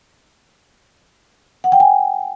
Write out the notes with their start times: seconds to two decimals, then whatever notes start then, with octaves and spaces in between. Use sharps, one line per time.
1.64 F#5
1.72 G5
1.80 G#5